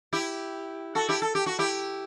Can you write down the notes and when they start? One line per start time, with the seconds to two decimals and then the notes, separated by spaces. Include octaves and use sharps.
0.13 E4 G4
0.95 F#4 A4
1.09 E4 G4
1.22 A4
1.35 G4
1.46 F#4
1.59 E4 G4